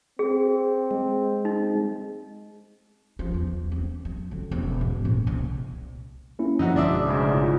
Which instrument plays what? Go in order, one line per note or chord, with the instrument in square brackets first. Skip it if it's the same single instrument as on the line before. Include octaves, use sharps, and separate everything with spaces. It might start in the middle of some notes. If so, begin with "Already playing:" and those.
[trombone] C4 [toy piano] G#4
[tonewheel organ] G#3
[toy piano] D#4
[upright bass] F3
E2
C4
F#3
D3
E1
G#2
A#2
C2
[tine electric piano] A#3 C#4 E4
[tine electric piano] F#2 D3 F3 [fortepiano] D#4 E4 F#4
[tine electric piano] G#1 B2 D#6 [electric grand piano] G#3 [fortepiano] D4 D5 E5
[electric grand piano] D2 G#2 C#3
[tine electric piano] E4 F4